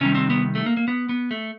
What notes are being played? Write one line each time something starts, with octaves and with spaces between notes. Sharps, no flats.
C3 D#3 G3 C#4
C4
B3
A3
A#3
A#3
B3
B3
A3